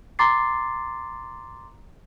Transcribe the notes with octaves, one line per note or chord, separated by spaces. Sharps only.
A#5 C6 D6 A6 C7